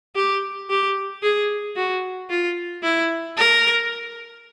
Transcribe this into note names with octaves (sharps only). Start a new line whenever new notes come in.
G4
G4
G#4
F#4
F4
E4
A#4